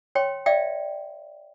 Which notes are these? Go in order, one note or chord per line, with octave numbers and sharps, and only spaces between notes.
C#5 G5 C6
D5 E5 F5 G5